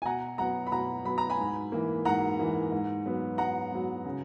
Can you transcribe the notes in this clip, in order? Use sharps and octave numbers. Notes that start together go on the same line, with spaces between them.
G#5
B2 F#5 A#5
F#3 B3 F#5 A#5
B5
B2 F#5 A#5
F#3 B3 B5
A#5
G#5 B5
G#2
E3 A#3
G#2 F#5 A#5
E3 A#3
G#2
F#3 B3
G#2 F#5 A#5
F#3 B3
C#3